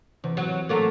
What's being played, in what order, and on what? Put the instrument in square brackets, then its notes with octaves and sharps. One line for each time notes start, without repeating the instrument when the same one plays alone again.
[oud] E2 [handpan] C3 E3 C5
[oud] F#3
F#3 A3 A#3